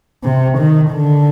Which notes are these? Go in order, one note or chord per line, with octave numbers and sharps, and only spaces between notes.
C3
D#3
D3